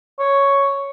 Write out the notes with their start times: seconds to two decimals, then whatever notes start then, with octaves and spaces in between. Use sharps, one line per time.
0.19 C#5